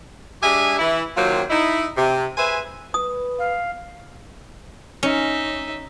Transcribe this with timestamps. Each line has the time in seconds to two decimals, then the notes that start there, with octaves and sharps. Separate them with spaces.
0.42 G#3 D4 G4 G#4 E5 G#5
0.79 E3 E4
1.16 C3 D#3 F#3 A#3 C4 F4
1.50 D#4 E4
1.97 C3
2.37 G#4 B4 C5 E5 G#5
2.94 B4 D#6
3.38 F5
5.03 C#4 D#4 E5